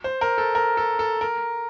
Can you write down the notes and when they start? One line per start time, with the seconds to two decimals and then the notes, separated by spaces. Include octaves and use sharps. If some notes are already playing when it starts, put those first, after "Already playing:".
0.04 C5
0.21 A#4
0.38 A4
0.55 A#4
0.77 A4
0.99 A4
1.21 A#4